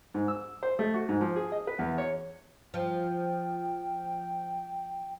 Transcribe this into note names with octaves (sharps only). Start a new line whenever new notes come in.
G#2
E6
C5
A3
F#4
G#2
F3
G#4
D#5
B4
E2
C#5
F3 G5